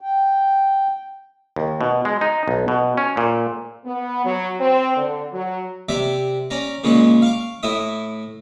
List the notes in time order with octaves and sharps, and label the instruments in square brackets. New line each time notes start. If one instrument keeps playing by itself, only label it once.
[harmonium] G5
[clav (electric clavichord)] D#2
B2
G#3
D#4
B1
B2
C#4
A#2
[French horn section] B3
F#3
C4
D3
F#3
[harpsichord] C3 D5 E5 D6
C#4 D5 A#5
A#2 C#3 G#3 C#4
F5 C#6 D6
A2 E4 E5 D#6